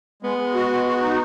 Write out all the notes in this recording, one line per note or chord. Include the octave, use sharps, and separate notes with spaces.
G#3 B3
G#3
F#4
G#3
F#4
D#4